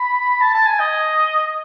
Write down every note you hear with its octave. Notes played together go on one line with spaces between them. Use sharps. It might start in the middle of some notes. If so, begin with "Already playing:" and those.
Already playing: B5
A5
A5
G#5
D#5